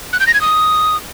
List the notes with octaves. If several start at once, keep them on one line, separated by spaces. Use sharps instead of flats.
F#6
G6
A#6
G#6
D#6